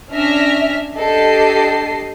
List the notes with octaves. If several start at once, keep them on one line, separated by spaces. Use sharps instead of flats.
C#4 D4 E5 F6 A#6 B6
D4 G4 A4 D#5 C7